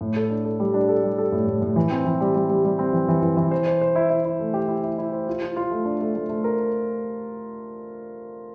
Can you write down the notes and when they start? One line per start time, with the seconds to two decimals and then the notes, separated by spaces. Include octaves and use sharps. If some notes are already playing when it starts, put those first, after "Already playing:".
0.01 A2
0.16 A4
0.30 D4
0.45 A4
0.60 G3
0.74 D4
0.89 A4
1.03 G3
1.18 A4
1.32 A2
1.47 A2
1.62 A2
1.76 E3
1.91 C4
2.05 E3
2.21 G3
2.35 G3
2.49 G3
2.64 G3
2.79 C4
2.93 E3
3.08 E3
3.22 E3
3.37 E3
3.51 C5
3.67 C5
3.81 C5
3.96 E4
4.10 E4
4.25 E4
4.39 A3
4.54 G4
4.68 E4
4.83 E4
4.98 E4
5.12 C5
5.27 F4
5.42 F4
5.57 F4
5.71 A3
5.85 D4
6.00 A3
6.15 A3
6.29 A3
6.44 A#4